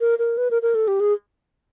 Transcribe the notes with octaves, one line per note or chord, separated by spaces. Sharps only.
A#4
A#4
B4
A#4
A#4
A4
G4
G#4